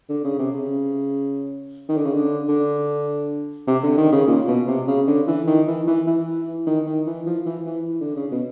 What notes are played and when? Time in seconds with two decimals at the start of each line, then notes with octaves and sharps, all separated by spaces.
0.09 D3
0.24 C#3
0.39 C3
0.54 C#3
1.89 D#3
1.97 D3
2.05 C#3
2.14 D3
2.48 D3
3.67 C3
3.83 D3
3.98 D#3
4.13 C#3
4.28 A#2
4.48 B2
4.68 C3
4.87 C#3
5.07 D3
5.28 E3
5.47 D#3
5.67 E3
5.87 E3
6.07 E3
6.67 D#3
6.86 D#3
7.06 E3
7.26 F3
7.46 E3
7.66 E3
8.01 D3
8.16 C#3
8.32 B2